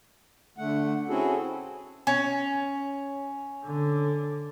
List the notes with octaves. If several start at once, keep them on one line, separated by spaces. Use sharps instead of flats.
D3 A3 F#5
C4 C#4 E4 F#4 G#4 A4
C#4
D3